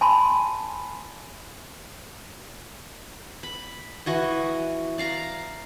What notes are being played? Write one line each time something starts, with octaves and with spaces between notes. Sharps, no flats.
G#5 A5 B5 C6
B5
E3 F#4 D#5
D5 F5 A#5